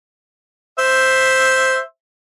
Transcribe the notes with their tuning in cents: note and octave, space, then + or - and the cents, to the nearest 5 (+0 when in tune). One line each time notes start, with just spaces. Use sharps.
C5 +0 E5 +0